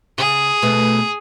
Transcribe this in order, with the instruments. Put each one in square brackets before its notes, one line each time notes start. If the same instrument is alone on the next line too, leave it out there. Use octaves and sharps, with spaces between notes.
[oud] C#3 [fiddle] G#4
[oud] B2 A3 B3